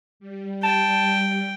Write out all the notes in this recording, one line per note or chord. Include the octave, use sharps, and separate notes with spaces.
G3
G5 A5